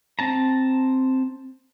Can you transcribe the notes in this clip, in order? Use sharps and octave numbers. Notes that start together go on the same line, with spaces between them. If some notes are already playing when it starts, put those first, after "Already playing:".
C4 A5 A#5